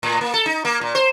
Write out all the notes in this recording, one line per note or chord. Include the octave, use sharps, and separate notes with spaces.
A2
A#3
A4
D#4
A#3
A#2
C5